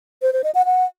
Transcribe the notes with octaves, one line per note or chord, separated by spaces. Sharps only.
C5
C5
D#5
F#5
F#5